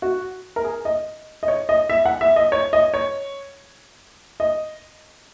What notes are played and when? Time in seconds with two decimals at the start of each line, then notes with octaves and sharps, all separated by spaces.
0.02 F#4
0.56 A#4
0.64 G#4
0.85 D#5
1.43 D#5
1.48 C#5
1.69 D#5
1.90 E5
2.06 F#5
2.21 E5
2.36 D#5
2.52 C#5
2.73 D#5
2.94 C#5
4.40 D#5